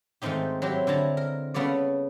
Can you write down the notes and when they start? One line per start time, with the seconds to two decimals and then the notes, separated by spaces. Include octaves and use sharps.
0.22 G#2 D#3 A3 C4 D#4 G4
0.62 F#3 C4 E4 G4
0.87 D3 E4 A5 A#5
1.17 A#4
1.54 C#3 B3 A4 C#5 D5